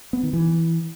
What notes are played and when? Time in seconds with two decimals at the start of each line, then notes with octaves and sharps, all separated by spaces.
0.13 B3
0.23 D#3
0.33 E3